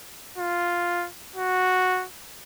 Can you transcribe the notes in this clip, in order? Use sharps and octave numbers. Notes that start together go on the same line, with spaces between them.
F4
F#4